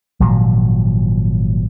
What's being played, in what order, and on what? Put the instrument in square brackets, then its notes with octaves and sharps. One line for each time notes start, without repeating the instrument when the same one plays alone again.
[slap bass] G#1 A#2 F3 F#3